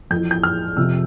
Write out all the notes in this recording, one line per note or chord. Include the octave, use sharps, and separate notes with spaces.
F2 E3 G6
G6
F6
F2 C3 F3 E6